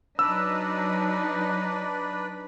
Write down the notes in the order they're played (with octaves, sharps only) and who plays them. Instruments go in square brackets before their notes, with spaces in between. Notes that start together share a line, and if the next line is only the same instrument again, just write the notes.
[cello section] F#3 D#4 [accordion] D4 B4 [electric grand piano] E6